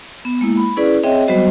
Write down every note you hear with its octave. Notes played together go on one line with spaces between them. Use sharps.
B3
G#3 A#3 E4
B5
C#4 E4 G#4 B4 D5
C4 G#4 C#5 D#5 E5 G5
F#3 G3 B3 F#4 C5 D#5